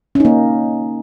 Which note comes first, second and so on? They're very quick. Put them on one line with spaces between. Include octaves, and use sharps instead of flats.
C#4 D#4 A#3